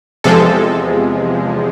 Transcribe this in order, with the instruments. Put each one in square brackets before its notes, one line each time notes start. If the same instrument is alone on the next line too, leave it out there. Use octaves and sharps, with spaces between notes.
[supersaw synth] E2 C3 F3 G#3 A4